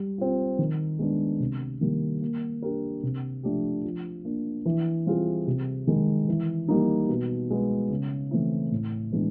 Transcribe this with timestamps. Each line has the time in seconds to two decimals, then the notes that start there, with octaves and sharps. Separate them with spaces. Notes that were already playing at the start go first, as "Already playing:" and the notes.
Already playing: G3
0.18 C4 F4
0.59 D#3
0.99 G#3 B3 D4
1.40 C3
1.81 D#3 G3 A#3
2.21 A#3
2.62 D4 G4 A#4
3.03 C3
3.43 F3 A3 D4 G4
3.84 F3
4.25 A#3 D4
4.66 E3
5.06 G3 C4 F4 G#4
5.47 C3
5.87 D#3 G#3
6.28 E3
6.68 G3 A#3 D#4
7.09 B2
7.50 G#3 B3
7.91 C#3
8.31 E3 A3 C4 E4
8.72 A2
9.12 E3 G#3 B3 D4